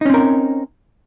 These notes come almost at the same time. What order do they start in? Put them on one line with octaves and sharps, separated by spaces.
D#4 C#4 C4 A#4